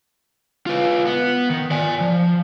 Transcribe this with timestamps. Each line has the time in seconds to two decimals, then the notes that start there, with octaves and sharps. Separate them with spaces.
0.66 F4 B4
1.06 B3
1.50 D#3
1.71 D5 G#5
2.01 F3